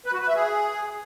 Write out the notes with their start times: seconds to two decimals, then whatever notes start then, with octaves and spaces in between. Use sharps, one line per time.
0.06 B4
0.13 F#4
0.20 B4
0.28 E5
0.35 G#4